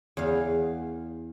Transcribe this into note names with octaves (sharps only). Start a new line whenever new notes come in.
E2 F5